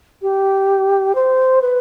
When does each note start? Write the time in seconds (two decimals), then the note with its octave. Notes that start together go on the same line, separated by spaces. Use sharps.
0.22 G4
1.15 C5
1.62 B4